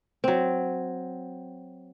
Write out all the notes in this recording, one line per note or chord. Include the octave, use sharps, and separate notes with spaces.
F#3 C4